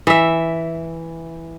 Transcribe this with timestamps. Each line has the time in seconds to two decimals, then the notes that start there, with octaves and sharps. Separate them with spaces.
0.07 E3 E5